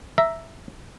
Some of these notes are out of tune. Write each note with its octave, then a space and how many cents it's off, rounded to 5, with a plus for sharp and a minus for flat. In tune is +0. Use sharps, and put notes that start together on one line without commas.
E5 +0 A#5 +0